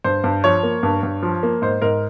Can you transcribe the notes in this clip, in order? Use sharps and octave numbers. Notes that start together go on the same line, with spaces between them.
G2 C5
G2
F3 C#5
A#3
G2
G2
F3
A#3
G#2 C5
G#2 A#4